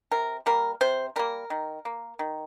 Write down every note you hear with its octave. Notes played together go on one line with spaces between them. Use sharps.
C3 A#4
G3 A#3 A#4
C3 C5
G3 A#3 A#4
D#3
A#3
D#3